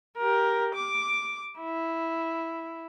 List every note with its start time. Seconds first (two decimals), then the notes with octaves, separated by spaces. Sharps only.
0.18 G4 A#4
0.75 D6
1.60 E4